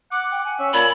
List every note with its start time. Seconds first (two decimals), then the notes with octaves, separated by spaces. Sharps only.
0.11 F#5 D6
0.31 G5
0.45 G#5
0.59 C#4 E5
0.74 A#2 A5 B5 G#6